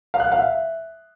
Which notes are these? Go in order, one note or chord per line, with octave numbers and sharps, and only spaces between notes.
F5
F#6
F#5
F5
E5